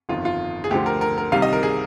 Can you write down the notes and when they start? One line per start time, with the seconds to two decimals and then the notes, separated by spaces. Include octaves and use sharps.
0.09 G1 F2 D#3 F4
0.25 F4
0.64 G#4
0.71 D2 D3 F3 G4
0.86 A#4
1.01 A#4
1.18 A#4
1.32 C2 C3 D#3 G3 F5
1.42 D#5
1.53 A#4
1.63 G#4